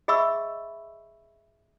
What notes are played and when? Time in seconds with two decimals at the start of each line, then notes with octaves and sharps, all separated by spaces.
0.08 G#4 D#5 E5 B5 C#6 E6